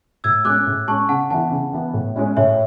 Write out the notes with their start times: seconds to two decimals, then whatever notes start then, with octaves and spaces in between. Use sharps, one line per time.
0.24 A2 E6 G#6
0.45 G#3 D6 F#6
0.49 C#4
0.66 A2
0.88 G#3 C#4 A5 C#6
1.09 C#3 F#5 A5
1.30 E3 B3 E4 F#5 A5
1.51 C#3
1.72 E3 B3 E4
1.94 A2
2.16 G#3 C#4 E4
2.37 A2 C#5 E5